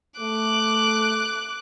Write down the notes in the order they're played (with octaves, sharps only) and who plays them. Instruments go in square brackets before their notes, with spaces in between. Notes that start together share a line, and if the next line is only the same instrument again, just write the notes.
[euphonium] A3 [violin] D6 F#6